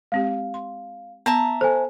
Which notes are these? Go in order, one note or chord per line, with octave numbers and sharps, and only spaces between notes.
G#3 C4 G4 F5
C6
B3 E5 A5 A#5
A4 C5 G#5